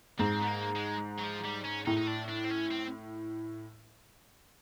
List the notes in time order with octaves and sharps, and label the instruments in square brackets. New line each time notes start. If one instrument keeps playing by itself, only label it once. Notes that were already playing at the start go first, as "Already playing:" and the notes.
[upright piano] G#2 [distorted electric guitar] C4
[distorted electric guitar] B3
A#3
G#3
F#3
F3
G3
C#4
[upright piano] A2 [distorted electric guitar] D#4
[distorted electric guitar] D#4
D4
D4
C4
C#4
C4